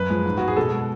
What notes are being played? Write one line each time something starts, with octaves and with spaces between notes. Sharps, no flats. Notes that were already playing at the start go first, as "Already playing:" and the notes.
Already playing: F#2 B4
F3 G#3
G#2
G#3 F#4
G#4
B2 A4
G#3